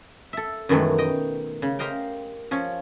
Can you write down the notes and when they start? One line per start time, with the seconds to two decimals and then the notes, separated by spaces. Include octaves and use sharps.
0.33 A4 E5
0.69 F#2 B2 D#3 E3 G#3 A3
0.98 D#5 G5
1.62 C#3
1.79 G4 A#4 C5 D#5 F5 G5
2.51 F3 C#4